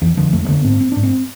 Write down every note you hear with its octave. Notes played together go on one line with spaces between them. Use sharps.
F2 E3
D3 F3
F2 A3
A3
D3 B3
G#2 C4
C4
G#2 D4
C4